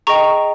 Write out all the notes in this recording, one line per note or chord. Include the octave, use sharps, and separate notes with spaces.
G#4 D#5 G5 A#5 C#6